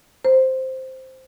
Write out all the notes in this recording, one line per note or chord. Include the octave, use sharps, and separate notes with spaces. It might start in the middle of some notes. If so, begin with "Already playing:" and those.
C5